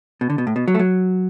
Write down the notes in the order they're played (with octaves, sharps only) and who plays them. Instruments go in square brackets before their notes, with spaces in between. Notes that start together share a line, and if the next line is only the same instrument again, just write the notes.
[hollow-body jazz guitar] B2
D3
B2
A2
B2
F#3
A3
F#3